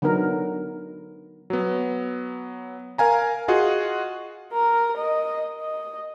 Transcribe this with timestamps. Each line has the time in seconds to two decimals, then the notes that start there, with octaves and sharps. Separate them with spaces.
0.02 D3 F#3 B3 D#4 A#4
1.50 F#3 B3
2.98 A#4 F5 G#5 A#5
3.48 F4 F#4 G#4 D#5 F#5
4.52 A#4
4.98 D#5
5.61 D#5